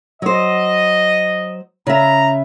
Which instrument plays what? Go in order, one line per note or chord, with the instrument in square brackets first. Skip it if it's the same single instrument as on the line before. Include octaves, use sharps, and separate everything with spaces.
[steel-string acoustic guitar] F#3 C5 [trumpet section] D#5
[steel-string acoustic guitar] C#3 E5 [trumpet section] A#5